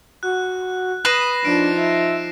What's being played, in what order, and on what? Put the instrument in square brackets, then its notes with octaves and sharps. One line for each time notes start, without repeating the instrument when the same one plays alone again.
[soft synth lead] F#4 [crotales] F#6
[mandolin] B4 [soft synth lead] D#6 [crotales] A#6 C7 E7
[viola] F3 D#4 [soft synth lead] D4 [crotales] D7
[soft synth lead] E5